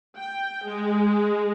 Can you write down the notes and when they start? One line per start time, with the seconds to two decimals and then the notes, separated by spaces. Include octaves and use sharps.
0.19 G5
0.67 G#3